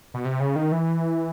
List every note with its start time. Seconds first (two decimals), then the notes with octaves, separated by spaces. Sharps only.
0.14 B2
0.25 C3
0.40 C#3
0.56 D#3
0.72 E3